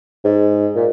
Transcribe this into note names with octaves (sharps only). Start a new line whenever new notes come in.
G#2
A#2